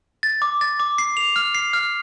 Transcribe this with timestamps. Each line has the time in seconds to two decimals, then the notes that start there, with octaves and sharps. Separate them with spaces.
0.23 A6
0.42 D6
0.61 A6
0.80 D6
0.98 C7
1.17 F7
1.36 F6
1.55 C7
1.73 F6